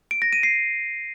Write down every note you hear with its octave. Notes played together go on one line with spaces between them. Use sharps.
D7
A#6
D#7
C7